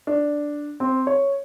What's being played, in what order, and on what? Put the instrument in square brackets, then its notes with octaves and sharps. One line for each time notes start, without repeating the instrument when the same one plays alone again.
[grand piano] D4
C4
C#5